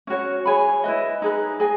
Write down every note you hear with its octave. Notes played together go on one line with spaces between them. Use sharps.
C#4 F#4 C#5
G#4 C#5 G#5 B5
E4 B4 D#5
D#4 G#4 B4
G#4 D#5 G#5